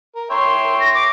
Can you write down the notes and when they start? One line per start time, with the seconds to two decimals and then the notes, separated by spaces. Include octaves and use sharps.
0.15 A#4
0.30 C#5 E5 G5 C6
0.80 A#6
0.94 D6